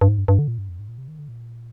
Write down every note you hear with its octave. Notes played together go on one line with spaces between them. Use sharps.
G2
G#2
G2
G2
D3
A#2
G2
F2
G#2
A#2
C3
D#3
D3
A#2